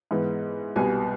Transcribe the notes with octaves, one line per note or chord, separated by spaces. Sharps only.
G#2 E3 G#3 B3
C2 B2 G3 B3 G#5